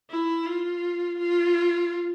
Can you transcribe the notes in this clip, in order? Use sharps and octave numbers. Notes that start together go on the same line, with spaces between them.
E4
F4
F4